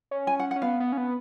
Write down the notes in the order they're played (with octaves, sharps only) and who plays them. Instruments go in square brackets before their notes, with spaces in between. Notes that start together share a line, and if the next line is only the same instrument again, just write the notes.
[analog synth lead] C#4
[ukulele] G#5
F#5
F#5
[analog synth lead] C#4
[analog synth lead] B3 [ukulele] F5
[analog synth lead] B3
C#4
B3